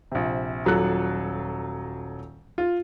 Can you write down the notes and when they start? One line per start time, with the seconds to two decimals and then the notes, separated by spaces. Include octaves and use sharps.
0.12 A#1 C3
0.66 D#1 F#3 F4 A4 F#6
2.58 F4